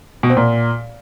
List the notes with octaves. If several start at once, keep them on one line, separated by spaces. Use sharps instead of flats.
B2
C4
A#2